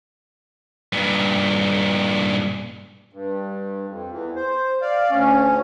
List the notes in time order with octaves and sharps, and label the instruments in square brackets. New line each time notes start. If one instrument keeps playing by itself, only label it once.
[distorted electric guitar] G2 A#2
[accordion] G2
F2
E2 E3
C5
D5 F5
D2 C#4